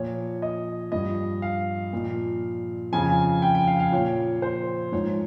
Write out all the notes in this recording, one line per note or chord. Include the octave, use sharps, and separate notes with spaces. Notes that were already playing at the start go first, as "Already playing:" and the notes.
Already playing: A#2 F3 C#5
D#5
G2 F3 D#5
F5
A#2 F3
F2 C#3 F3 G#5
G5
G5
F5
F5
A#2 F3 C#5
C5
G#2 F3 C#5